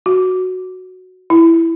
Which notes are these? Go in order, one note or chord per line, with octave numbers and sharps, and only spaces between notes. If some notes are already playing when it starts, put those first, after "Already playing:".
F#4
E4